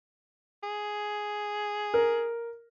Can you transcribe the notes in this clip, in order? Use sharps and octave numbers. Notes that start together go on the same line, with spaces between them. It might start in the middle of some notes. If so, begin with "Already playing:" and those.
G#4
A#4